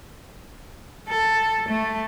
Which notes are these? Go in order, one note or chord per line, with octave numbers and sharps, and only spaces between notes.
A4
A3